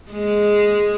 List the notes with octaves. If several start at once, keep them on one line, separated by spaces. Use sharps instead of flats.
G#3